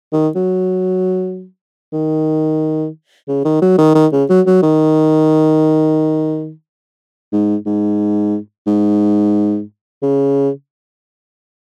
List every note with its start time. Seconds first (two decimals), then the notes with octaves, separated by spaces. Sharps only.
0.13 D#3
0.35 F#3
1.93 D#3
3.28 C#3
3.45 D#3
3.62 F#3
3.78 D#3
3.95 D#3
4.12 C#3
4.29 F#3
4.46 F#3
4.63 D#3
7.33 G#2
7.66 G#2
8.67 G#2
10.03 C#3